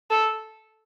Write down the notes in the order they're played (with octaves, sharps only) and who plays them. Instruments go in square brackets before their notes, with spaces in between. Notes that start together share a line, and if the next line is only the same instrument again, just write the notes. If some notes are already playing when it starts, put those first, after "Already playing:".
[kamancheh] A4